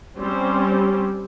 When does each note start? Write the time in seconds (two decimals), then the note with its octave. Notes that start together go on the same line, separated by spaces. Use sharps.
0.18 G3 C4 C#4 C5